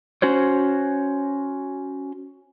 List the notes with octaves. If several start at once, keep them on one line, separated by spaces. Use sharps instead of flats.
C#4 F#4 C5 C#5